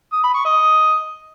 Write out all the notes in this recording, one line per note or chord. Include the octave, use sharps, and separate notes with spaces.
D#6
B5
C#6
D#5